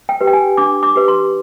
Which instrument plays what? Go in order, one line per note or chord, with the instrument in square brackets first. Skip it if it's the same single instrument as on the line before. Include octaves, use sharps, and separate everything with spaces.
[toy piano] G5
G4 B4
G5
G#5
D4 D6
D6
G4 B4
C6